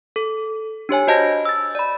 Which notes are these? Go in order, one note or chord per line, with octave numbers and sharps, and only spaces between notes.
A4
D4 G4 C#5 G#5
F#4 C5 D#5 A5 G6 A#6
E6 A6
D5 B5